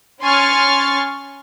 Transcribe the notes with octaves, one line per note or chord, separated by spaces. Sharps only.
C#4 G#5 C6 C#6 F6 A6